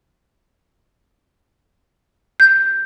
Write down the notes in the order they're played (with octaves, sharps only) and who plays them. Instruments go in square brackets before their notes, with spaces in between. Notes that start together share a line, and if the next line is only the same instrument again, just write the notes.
[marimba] G6